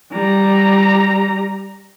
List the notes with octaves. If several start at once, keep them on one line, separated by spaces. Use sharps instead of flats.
G3 A#5